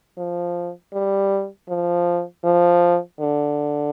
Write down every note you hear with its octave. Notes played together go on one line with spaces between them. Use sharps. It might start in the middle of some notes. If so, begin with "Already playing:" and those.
F3
G3
F3
F3
D3